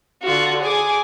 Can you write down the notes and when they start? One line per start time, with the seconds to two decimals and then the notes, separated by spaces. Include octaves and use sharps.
0.23 D3 F4 F#4
0.62 G#4 G#5 D6